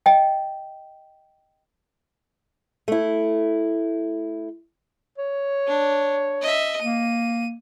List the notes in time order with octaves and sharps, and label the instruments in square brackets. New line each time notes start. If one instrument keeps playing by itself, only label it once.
[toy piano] D#5 G5
[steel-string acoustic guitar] A3 E4
[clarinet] C#5
[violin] D4
D#5 E5
[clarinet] A#3 [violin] D#7